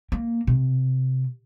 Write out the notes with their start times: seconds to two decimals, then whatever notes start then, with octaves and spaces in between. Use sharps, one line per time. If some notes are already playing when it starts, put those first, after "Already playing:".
0.12 A#3
0.47 C3